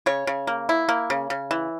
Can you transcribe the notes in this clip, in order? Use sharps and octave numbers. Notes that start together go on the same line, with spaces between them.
C#3 C#5
C#3
A#3
E4
A#3
C#3
C#3
E3